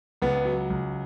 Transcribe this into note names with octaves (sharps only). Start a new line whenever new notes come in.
C#2 B3
F#3
C#2